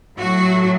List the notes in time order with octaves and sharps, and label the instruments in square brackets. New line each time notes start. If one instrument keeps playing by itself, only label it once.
[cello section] A2 F#3 F#4